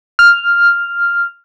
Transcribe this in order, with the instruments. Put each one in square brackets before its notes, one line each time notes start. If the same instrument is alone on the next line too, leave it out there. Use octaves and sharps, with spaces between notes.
[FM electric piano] F6